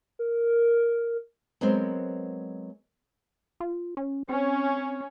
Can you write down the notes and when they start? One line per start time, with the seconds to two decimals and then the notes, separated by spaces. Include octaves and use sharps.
0.19 A#4
1.61 F#3 G#3 B3 C4 A#4 C5
3.60 F4
3.97 C#4
4.29 C4 C#4